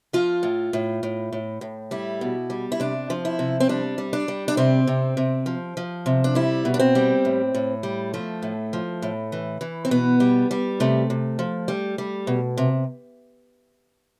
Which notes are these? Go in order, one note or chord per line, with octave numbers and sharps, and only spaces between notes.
F3 F4
A2
A2
A2
A2
A2
G3 E4
B2
G3
E4
C3 D4
F3
E4
C3
C4
G3 D4
G3
D4
G3
D4
C3 C4
C3
C3
F3
F3
C3
D4
G3 E4
B2
D4
C4
G3
A2
A2
G3
F3 A3
A2
F3
A2
E3
E3
C4
B2 B3
G3
G3
C3 A3
C3
F3
G3
G3
B2
C3